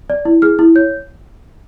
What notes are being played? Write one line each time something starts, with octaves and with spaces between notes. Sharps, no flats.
D5
E4
G#4 F6
E4
C#5 G6